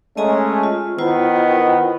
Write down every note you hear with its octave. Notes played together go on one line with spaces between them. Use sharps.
G#3 A3 C#4 D#5 G#5 A#5
F4
D#3 B3 E4 F4 C5